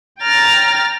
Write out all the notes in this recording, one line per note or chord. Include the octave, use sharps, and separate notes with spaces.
G5 A#5 F6 A6